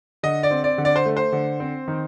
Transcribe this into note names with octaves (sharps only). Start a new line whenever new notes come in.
D3 D#5
D5
C4
D5
D3
D5
C5
A3
C5
D3
C4
D#3